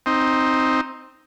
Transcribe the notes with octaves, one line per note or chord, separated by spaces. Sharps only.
C4 D#4